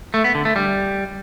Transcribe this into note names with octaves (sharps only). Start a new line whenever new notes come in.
A3
B3
D3
A3
G3